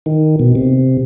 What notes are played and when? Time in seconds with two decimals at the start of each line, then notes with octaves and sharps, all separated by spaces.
0.06 D#3
0.40 B2
0.55 C3